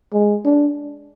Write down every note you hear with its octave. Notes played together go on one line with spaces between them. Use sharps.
G#3
D4